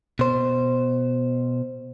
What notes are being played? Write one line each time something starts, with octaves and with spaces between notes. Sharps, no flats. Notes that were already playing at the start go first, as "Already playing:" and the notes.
B2 C5